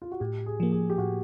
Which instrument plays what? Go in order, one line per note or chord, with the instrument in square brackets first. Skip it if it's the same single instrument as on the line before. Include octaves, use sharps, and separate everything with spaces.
[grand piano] F4
F#4
[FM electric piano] A2 [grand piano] G4
[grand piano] G#4
[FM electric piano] F3 A#3
[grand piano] G#4
G4
[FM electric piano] A2 [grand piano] F#4